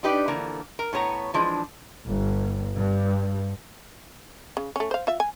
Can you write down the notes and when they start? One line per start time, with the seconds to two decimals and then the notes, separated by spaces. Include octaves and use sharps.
0.03 D4 D#4 G4 B4 D5
0.28 D3 E3 F3 A#3
0.79 A#4
0.93 A2 B3 C#5 A#5
1.34 E3 F3 G#3 D4
2.07 G1
2.76 G2
4.57 C#3
4.76 A3 C#4
4.91 C5 F5
5.07 F4 E5
5.20 G#5